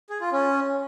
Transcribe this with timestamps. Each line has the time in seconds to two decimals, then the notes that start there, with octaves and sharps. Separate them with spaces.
0.10 G#4
0.21 F4
0.32 C#4